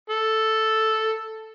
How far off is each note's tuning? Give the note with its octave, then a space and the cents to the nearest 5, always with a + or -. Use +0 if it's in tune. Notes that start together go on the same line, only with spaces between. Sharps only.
A4 +0